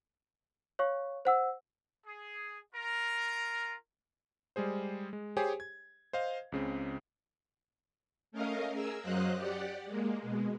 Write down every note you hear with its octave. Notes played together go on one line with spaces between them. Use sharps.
C#5 F5 C#6
C5 F#5 E6
G#4
F4 A#4
G3 G#3 G#4 C5
G#3
G4 G#4 C5 C#5 G5 G#5
G#6
C5 D#5 F5
C#2 C#3 C4
A3 C#4 A#4 D#5 F5
G#4 A#4 E6
F#2 F#3 C5 D#5 F5 F#6
G4 D5 F#5
G#3 A#3
B2 G#3